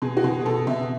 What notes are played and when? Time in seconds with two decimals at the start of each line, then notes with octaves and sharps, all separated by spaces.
0.02 B2 G#4
0.17 F#4
0.23 B2 G#4
0.41 G#4
0.45 B2 A4
0.67 B2 E5